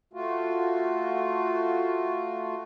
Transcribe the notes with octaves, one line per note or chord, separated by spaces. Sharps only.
A3 F4 F#4